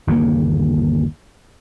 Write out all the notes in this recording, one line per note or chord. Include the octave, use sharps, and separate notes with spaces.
G1 D#2 C#3 A#3